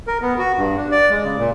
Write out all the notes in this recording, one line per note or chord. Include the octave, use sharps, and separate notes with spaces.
A#4
B3
F#4
G2
D4
D5
G#3
C#3
A#2